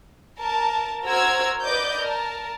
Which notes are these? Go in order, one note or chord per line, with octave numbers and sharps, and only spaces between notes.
A#4 A5
F#4 A#4 C5 A#5 E6 G#6
B4 D5 D#5 D6 G6
A#4 A5